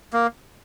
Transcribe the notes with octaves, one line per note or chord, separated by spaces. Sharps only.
A#3